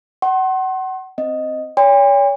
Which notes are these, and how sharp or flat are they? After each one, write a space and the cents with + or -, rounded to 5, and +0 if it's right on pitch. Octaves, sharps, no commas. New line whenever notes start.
F#5 +30 C6 +35
C4 +0 D#5 +0
C#5 +35 G5 +45 C6 -35